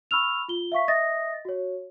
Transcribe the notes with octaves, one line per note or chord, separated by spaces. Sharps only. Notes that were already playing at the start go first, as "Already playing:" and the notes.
B5 C#6 E6 F6 F7
F4 G7
E5 F5 C#6 B6
D#5 E5 D#6 A6 A#6
F#4 C#5